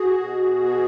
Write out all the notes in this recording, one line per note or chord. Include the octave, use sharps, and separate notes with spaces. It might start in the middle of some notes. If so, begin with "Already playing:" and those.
Already playing: F#4 G#4
B2
B3